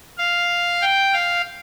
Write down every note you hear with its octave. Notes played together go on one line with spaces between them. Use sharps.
F5
G5
F5